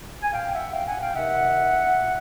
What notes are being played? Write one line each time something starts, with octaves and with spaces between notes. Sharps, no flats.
G#5
A#2 F5 G5
E5 F#5
F5 G5
F#5 G#5
F5 G5
C3 D#3 E5 F#5
A#2